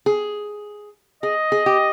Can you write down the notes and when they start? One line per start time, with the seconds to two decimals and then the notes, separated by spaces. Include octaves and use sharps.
0.06 G#4
1.23 G#4 D#5
1.52 G#4
1.66 G4